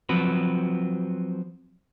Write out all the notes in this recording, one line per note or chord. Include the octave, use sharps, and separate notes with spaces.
F3 F#3 C4 F#4 B4